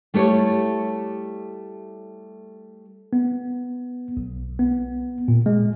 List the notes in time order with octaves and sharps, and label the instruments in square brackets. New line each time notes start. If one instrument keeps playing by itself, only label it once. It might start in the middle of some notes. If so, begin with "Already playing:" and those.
[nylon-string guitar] G3 A3 E4 G4 C#5
[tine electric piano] B3
B1
B3
A#2
G#3